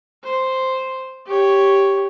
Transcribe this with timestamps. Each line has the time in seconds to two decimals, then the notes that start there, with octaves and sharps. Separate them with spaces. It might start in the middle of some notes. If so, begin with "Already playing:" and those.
0.24 C5
1.27 G4 C#5